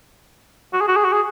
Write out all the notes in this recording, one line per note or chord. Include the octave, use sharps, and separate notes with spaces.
F#4
G#4
F#4
G#4
F#4
G#4